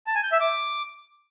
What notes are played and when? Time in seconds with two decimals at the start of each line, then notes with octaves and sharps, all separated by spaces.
0.07 A5
0.15 G#5
0.24 G6
0.32 E5
0.40 D6